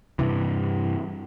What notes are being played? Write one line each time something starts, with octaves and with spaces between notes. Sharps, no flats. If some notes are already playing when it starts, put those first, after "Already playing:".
G2 C3 E3